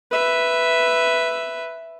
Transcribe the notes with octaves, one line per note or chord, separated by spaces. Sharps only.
B4 E5